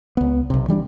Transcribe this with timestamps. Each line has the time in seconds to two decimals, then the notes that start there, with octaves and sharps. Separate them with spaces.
0.17 C#2 B3
0.50 B1 C3
0.68 E3 G3 C#4 D4